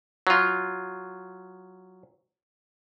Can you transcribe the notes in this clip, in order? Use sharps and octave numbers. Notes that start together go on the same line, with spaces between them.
F#3 F4